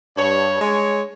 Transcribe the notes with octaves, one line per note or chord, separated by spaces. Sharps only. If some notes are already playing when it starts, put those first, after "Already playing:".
G2 C#5
G#3 C#5